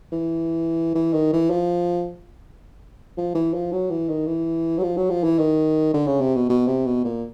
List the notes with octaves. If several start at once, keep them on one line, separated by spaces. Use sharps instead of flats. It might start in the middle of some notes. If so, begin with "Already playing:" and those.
E3
E3
D#3
E3
F3
F3
E3
F3
F#3
E3
D#3
E3
F#3
F3
F#3
F3
E3
D#3
D3
C#3
C3
B2
B2
C3
B2
A#2